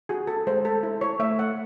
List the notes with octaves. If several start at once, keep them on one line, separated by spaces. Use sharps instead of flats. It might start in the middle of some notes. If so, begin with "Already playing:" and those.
F#4 G#4
A4
G#3 C5
A4
E4
C#5
A3 E5
F#5